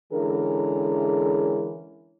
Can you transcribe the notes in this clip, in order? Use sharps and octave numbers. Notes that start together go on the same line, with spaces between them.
D3 E3 G#3 C#4 G#4 A#4